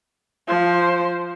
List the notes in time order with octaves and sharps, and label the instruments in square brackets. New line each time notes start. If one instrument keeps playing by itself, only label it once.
[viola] F3 C5